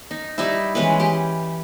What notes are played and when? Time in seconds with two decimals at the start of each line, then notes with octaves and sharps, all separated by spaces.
0.11 D#4
0.38 G3 D#4 E4
0.75 E3 G#3 C#4 B4
1.00 G4